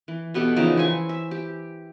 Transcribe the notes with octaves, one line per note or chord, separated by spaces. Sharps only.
E3
B2 B3 G4 A4
C#3 E3 F3 D#4
E4 C5 G#5 C#6
E5
G4